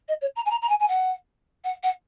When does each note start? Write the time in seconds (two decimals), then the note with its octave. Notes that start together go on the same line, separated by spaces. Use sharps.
0.08 D#5
0.21 C#5
0.36 A#5
0.45 G#5
0.50 A#5
0.62 A#5
0.69 G#5
0.79 G#5
0.88 F#5
1.64 F#5
1.83 F#5